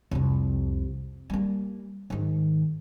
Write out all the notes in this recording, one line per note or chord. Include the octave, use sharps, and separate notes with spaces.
C2 F2
G3 A#3
G#2 D#3